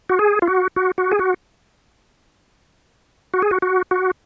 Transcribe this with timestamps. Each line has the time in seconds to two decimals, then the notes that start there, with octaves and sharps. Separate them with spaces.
0.09 F#4
0.19 G#4
0.42 F4
0.48 F#4
0.76 F#4
0.98 F#4
1.11 G#4
1.19 F#4
3.34 F#4
3.42 G#4
3.51 F#4
3.62 F#4
3.91 F#4